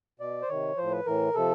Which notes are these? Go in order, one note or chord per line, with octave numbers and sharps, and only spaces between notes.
B2 D5
C5
C3 D#3 C#5
A2 F3 C5
B4
A2 E3 A#4
C3 F3 A4